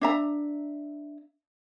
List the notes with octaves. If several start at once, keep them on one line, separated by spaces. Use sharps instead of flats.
D4 E5 A#5